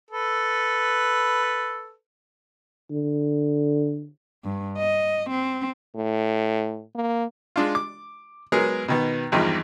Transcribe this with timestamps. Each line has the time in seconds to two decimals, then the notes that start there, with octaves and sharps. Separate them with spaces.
0.11 A4 B4
2.90 D3
4.44 G2
4.78 D#5
5.31 C4
5.95 A2
6.95 A#3
7.56 G#3 D4 F4
7.75 D6
8.52 F#3 G#3 B3 G#4 A#4
8.88 B2 D#3 B3
9.32 G#1 E2 G2 D#3 F3 D#5